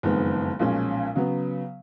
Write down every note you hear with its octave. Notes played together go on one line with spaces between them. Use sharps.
F#1 F2 D#3 G#3 B3
B1 A#2 F3 G#3 C#4
C#3 F#3 B3